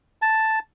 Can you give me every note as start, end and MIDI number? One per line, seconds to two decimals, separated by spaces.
0.22 0.59 81